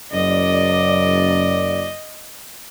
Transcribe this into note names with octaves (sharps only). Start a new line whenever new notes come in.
F#1 F#2 D5 D#5